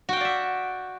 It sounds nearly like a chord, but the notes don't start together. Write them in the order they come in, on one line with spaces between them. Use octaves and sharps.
F#4 G5 F5 D5 E5